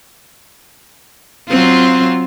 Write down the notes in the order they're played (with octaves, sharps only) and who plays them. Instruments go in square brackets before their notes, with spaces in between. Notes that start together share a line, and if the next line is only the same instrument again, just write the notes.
[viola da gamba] F#3 C4 F4